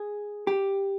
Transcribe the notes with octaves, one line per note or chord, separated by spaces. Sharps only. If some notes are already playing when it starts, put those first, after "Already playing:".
Already playing: G#4
G4